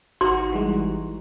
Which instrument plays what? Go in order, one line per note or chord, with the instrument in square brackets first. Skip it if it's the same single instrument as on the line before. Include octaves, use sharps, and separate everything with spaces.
[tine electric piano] G#1 D#4 A#5 [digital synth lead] F#4 [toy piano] C6
[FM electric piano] E3 G3 G#3